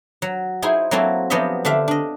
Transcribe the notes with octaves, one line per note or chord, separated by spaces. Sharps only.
F#3
D#4 E4 G#4 C5
F#3 A#3 C4 E4 F#4 A4
F3 F#3 B3 G4 D#5 E5
D3 D4 G4 E5 F5
D4 D#5